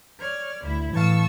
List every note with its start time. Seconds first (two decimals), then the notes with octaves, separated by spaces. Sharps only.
0.18 C#5 D5 F6
0.63 D2 E4
0.93 A2 E3 F5 A5 C#6 E6